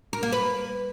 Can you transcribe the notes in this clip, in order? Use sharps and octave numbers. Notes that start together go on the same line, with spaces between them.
A#4
A#3
B4